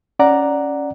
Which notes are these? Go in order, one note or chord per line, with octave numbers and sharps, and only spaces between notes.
C#4 D5 F#5 A#5